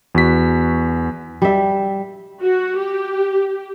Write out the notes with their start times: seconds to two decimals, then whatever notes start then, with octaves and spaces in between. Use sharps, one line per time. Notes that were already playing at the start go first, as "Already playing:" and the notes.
0.15 E2 F#4 B6
1.42 G3 E5
2.41 F#4
2.78 G4